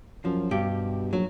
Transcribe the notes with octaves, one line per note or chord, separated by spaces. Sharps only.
F#2 F3
G2 B2 G4
A#1 F#3